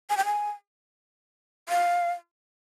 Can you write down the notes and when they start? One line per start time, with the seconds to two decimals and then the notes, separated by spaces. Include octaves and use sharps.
0.10 G#5
0.17 G5
0.25 G#5
1.69 F5